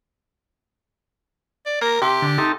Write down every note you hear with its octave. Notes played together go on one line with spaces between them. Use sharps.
D5
A#3 A#4
C3 G4
D3
C3 D#4 A4